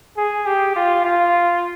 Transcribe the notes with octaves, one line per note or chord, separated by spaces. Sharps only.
G#4
G4
F4
F4